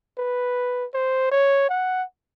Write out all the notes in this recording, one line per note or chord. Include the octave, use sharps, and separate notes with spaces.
B4
C5
C#5
F#5